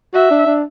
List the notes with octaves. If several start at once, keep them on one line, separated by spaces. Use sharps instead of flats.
F#4 E5
D4
D4